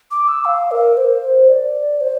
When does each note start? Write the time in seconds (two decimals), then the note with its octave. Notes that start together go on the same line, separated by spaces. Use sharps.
0.11 D6
0.28 E6
0.45 F5
0.71 A#4
0.97 C5
1.49 D5
2.01 C5